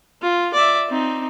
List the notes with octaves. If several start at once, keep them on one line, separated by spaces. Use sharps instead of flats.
F4
D5 E5
C4 D#4